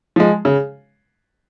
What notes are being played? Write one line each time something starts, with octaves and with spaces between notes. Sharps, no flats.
F3 G#3
C#3